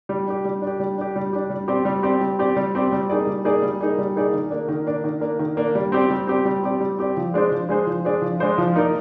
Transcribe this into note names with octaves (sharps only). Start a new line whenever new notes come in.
G3
D4 G4
G3
D4
G4
G3
D4 G4
G3
D4 G4
G3
C4 G4 D5
G3
C4 G4 D5
G3
C4 G4 D5
G3
C4 G4 D5
G3
A#3 D#4 G#4 D5
G3
A#3 D#4 G#4 D5
G3
A#3 D#4 G#4 D5
G3
A#3 D#4 G#4 D5
D#3
A#3 D4
D#3
A#3 D4
D#3
A#3 D4
D#3
A#3 D4
G3
C4 G4 D5
G3
C4 G4 D5
G3
C4 G4 D5
G3
C4 G4 D5
F3
G#3 D4 G#4 C5
F3
G#3 D4 G#4 C5
F3
G#3 D4 G#4 C5
F3
G#3 D4 G#4 C5
F3
A#3 D#4 A#4 D5